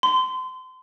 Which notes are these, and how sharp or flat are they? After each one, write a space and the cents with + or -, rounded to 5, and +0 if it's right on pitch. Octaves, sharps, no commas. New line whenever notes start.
C6 -30